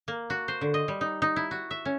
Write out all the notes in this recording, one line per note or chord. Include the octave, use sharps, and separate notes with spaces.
A#3
F#4
C5
D3
D#5
G3
D#4
D#4
E4
F#4
E5
C#4